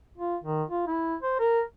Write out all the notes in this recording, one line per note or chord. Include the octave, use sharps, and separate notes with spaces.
F4
D#3
F4
E4
C5
A#4